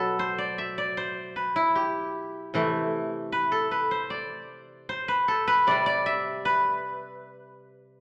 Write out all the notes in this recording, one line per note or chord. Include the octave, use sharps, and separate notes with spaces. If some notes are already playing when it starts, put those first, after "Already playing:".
Already playing: B2 F#3 A4 B4
C5
D5
E5
D5
C5
B4
E4
G4
C3 E3 A3
B4
A4
B4
C5
D5
C5
B4
A4
B4
C3 G3 D5
D5
E5
B4